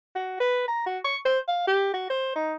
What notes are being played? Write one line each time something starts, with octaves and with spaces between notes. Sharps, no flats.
F#4
B4
A#5
F#4
C#6
C5
F5
G4
F#4
C5
D#4